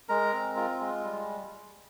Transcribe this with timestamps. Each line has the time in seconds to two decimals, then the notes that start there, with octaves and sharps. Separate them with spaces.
0.09 G#3 A#4 A#5
0.33 C4
0.56 F4
0.80 G#3
1.04 G3